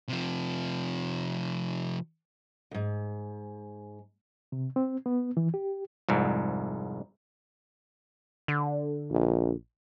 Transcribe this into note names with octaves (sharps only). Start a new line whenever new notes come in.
C3 F3
D2 G#2
C3
C4
B3
E3
G4
C2 F2 G#2
D3
A#1